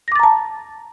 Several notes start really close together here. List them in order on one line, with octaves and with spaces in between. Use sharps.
A#6 D6 A6 A#5 A5